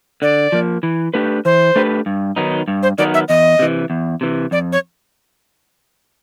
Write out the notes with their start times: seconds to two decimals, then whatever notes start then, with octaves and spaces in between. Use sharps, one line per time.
0.22 D3 D5
0.52 F3 A#3
0.83 E3
1.14 A3 D4 G4 B4
1.45 E3 C5
1.76 A3 D4 G4 B4
2.06 G2
2.36 D#3 F#3 B3 D#4
2.68 G2
2.83 C5
2.98 D#3 F#3 B3 D#4 D5
3.14 E5
3.28 E2 D#5
3.59 C3 E3
3.90 E2
4.21 C3 E3
4.51 F2 D5
4.73 C#5